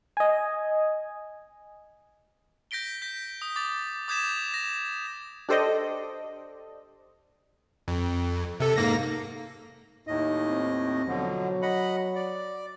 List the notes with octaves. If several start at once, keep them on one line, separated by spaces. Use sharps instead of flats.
D#5 G#5
G6 A#6 B6 D7 G7
G6 A#6 B6
D#6
D6 D#6 A6
D6 D#6 G6 G#6 B6 E7
A#6
D4 G4 A4 C5 D5 D#5
F2
C3 A4
G#2 A#3 A#6
D#2 A2 D#4 D#5
C4
B2 D3 F3 F#3
D#5 F#5 B5
D5